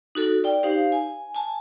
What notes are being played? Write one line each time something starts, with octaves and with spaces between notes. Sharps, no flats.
D#4 F#4 A4
D5 G5
D#4 G4 C5 F5
G#5
G#5 A5